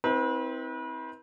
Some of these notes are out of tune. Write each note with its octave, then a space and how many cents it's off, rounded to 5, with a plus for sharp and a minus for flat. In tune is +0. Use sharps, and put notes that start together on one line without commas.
C4 +0 E4 -35 B4 -35